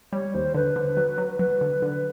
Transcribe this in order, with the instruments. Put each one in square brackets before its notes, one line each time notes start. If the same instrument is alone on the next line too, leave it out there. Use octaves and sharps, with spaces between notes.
[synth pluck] G3 [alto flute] C#5
[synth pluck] D#2 [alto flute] C5
[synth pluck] D3 [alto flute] B4
[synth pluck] D3
F#3
F#3
[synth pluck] F#3 [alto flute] B4
[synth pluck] D3
D3